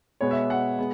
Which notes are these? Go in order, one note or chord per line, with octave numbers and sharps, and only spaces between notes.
B2 G#3 B3 C#5
E5
F#5
G#3 B3